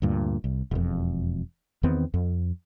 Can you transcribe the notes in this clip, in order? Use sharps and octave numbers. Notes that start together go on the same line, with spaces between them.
D2 G2 A#2
C2
E1 F2
E2 D#3 B3 C4
F2